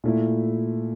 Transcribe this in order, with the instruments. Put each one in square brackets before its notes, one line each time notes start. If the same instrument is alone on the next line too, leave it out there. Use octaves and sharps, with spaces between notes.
[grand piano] A#2 A3 E4